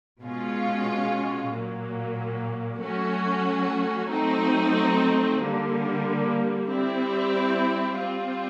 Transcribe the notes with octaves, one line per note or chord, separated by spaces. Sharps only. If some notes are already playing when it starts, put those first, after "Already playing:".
B2 G#3 C#4 F4
A#2 F#3 A#3
F#3 A3 C#4 F#4
F#3 A3 C4 D#4
D3 G3 A#3
G3 C4 E4
G3 C4 F4